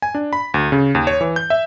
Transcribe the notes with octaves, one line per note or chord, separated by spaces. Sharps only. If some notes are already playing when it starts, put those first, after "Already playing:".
G#5
D4
B5
D2
C#3
D#2
C#5
E3
G6
E5